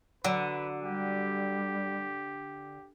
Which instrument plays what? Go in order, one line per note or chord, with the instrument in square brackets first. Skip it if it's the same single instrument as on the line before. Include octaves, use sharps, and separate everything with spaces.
[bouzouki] D3 [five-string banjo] F#3 [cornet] B4
[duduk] G3 [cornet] G4